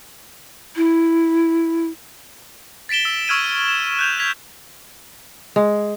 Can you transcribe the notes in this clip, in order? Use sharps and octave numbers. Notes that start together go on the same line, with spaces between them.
E4
A6 B6 D7 E7 G7
E6
C#6 E6 F6 G#6 D7 D#7
E7
F#6 G6 F7
G#6 B6 F7
G#3